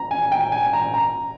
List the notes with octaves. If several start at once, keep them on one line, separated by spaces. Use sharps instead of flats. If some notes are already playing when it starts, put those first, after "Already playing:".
Already playing: A#5
G#5
G5
G#5
A#5
A#5